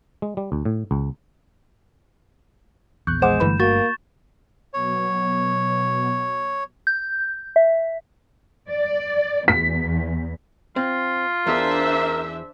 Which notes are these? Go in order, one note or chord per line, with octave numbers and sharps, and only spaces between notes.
G#3
G3
D2
A2
C#2
A#1 E2 C#6 F#6 G6
G#3 C5 F#5 D6 E7
G1 G2 D3 E3 A3 B5
A#3 F#4 C#6 A6
B2 F#3 B3 C#5
G6
E5
D5
E2 B6
C4 F4
E2 D4 A#4 C5 E5